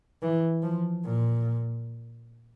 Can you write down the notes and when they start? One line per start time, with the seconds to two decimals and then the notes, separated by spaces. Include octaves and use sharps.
0.22 E3
0.63 F3
1.05 A#2